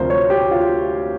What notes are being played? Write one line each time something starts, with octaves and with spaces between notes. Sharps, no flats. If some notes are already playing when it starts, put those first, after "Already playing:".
Already playing: D2 C3 F3 A#4 C5
C#5
G4
F4